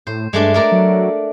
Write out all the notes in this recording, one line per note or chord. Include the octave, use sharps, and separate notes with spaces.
A2 C5
G2 G#3 A3 D4
A3 A#4 D5
F#3